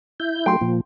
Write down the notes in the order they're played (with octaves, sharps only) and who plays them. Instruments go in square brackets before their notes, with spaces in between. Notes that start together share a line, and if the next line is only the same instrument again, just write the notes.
[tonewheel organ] E4 G6
[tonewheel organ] F#3 A3 [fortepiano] G5 C6
[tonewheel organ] A#2 F3